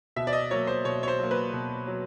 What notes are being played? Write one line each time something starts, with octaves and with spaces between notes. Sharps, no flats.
B2 E5
D5
D#5
F#3 A#3 C#5
C5
B2 C#5
C#5
C5
F#3 A#3
B4
B2
F#3